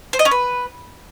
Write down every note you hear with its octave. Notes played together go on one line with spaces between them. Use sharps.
C5
D#5
C#4
B4